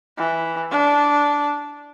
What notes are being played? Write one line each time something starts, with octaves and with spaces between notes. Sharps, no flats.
E3
D4